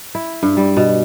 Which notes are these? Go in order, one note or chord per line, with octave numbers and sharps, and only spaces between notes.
E4
G2
G3
B2